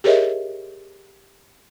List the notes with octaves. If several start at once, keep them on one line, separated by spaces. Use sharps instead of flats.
G4 G#4 A#4 C#5 D#5 E5